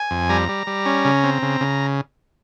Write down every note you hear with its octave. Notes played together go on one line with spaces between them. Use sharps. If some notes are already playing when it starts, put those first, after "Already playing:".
Already playing: G#5
F2
G3 A#5
G3
G3
C#4
C#3
C4
C#3
C#3